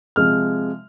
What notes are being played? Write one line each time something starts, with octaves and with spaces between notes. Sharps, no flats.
C3 F3 G#3 F6